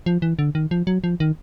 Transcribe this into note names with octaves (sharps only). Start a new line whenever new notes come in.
F3
E3
D3
D#3
F3
F#3
F3
D#3